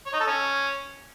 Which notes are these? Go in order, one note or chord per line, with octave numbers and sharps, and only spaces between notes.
C#5
D#4
A4
C#4